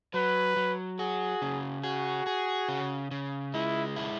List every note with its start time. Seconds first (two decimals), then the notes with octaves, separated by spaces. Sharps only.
0.14 F#3 B4
0.57 F#3
0.99 F#4 G#4
1.42 C#3
1.83 F#4 G#4
2.27 G#4
2.68 C#3
3.11 C#3
3.54 G#3 E4
3.96 E4